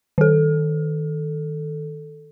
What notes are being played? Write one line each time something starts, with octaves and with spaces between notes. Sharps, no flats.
D#3 A4